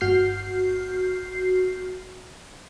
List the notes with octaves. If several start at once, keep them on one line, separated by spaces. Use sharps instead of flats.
G1 F#4 F6 G6 C7